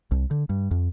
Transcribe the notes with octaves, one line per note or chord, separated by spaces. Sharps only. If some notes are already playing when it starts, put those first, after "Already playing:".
C2
D3
G2
F2